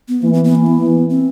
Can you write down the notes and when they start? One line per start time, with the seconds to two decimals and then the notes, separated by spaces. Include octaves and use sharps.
0.09 B3
0.22 E3 A#3
0.33 B3
0.44 B3
0.55 A#3
0.66 B3
1.10 C4